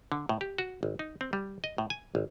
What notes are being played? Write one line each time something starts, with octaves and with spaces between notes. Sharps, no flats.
D3
A2
G4
F#4
G#1
D#4
C4
G3
D#5
A2
G#5
G#1